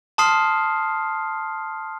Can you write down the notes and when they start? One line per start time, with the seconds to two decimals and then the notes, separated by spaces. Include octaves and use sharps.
0.18 A5 C6 D#6 F6 C7